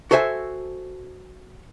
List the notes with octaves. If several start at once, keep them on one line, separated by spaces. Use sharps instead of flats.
F#4 A4 C5 E5 G#5